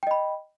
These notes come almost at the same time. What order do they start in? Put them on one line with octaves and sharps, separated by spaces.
G5 D#5 B5